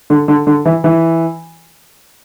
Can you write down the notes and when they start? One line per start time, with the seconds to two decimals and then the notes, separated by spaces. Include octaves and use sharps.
0.10 D3
0.28 D3
0.47 D3
0.65 E3
0.84 E3